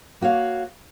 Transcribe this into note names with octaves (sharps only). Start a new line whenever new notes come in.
A#3 F#4 C#5 F5